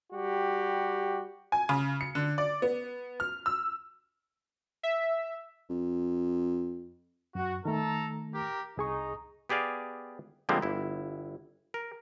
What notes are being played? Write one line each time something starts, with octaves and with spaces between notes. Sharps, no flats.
G3 F#4 G4
G#5
C#3
C#7
D3
D5
B3
F6
E6
E5
F2
F#2 F#4
D#3 A3 A4 A#5
G4 A#4
C2 D#4 G#4 C#6
B3 G4 G#4 D5 F5
D3 F3 G3 G#3 A#3 C4
G1 E4
A#4